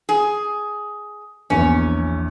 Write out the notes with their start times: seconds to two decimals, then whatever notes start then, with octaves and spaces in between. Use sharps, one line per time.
0.09 G#4
1.50 A#1 E2 C#4